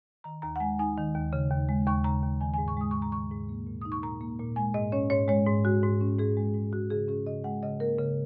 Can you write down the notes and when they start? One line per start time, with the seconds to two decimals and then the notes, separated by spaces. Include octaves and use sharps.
0.24 D#3 A#5
0.42 D#2 A#5
0.56 F#5
0.60 G#3 G#5
0.79 D#4 G#5
0.97 D#3
1.15 D#2
1.33 C#3
1.51 D#2
1.69 G#3
1.87 D#2 C#6
2.04 C#3 A#5
2.23 D#2
2.41 D#3 G#5
2.54 G#5
2.58 G#2
2.68 C#6
2.77 G#3 D#6
2.91 G#2 C#6
3.02 A#5
3.12 D#3 C#6
3.31 G#2
3.49 A#3
3.67 A#2
3.81 D#4 D#6
3.92 C#6
4.03 A#2 A#5
4.21 A#3
4.39 A#2
4.56 G#3 G#5
4.74 G#2 D#5
4.92 C#4 C#5
5.10 G#2 C#5
5.28 G#3 C#5
5.46 G#2
5.65 G#3 F#4
5.83 G#2
6.01 C#4
6.18 G#2 G#4
6.37 G#3
6.54 G#2
6.73 G#3 F#4
6.91 C#3 G#4
7.08 C#4 G#4
7.26 C#3 D#5
7.44 G#3 F#5
7.63 C#3 D#5
7.80 A#3 A#4
7.99 C#3